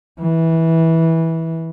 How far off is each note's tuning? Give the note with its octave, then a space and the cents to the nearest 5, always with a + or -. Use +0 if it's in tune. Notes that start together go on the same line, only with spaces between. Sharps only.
E3 -15